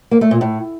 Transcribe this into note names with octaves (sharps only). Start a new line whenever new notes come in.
A#3
A3
A#2
A2